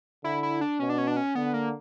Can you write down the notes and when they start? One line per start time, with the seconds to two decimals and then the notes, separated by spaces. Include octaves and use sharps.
0.24 D3 E4
0.43 E4
0.61 D4
0.80 B2 C#4
0.89 D4
0.98 C#4
1.08 D4
1.17 C#4
1.35 D3 B3
1.54 A#3